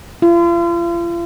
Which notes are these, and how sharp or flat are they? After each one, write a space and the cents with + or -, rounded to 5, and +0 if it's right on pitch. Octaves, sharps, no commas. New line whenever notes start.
F4 -40